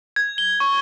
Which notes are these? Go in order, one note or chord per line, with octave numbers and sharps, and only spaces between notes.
G#6
G7
C#6